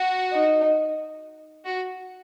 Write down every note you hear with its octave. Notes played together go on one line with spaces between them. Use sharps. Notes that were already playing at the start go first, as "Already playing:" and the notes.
Already playing: F#4
D#4
F#4